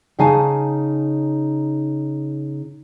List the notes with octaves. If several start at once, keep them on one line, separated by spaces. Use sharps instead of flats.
C#3 D#4 F5 G#5 A5